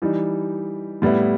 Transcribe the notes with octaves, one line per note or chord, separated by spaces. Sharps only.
E3 G3 D#4
A2 G3 B3 E4